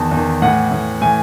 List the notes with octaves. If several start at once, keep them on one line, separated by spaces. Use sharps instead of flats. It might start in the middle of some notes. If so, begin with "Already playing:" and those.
Already playing: E2 D#3 A5
E2
D#3
A2 E3 F#5
A2 E3
A2 E3 G#5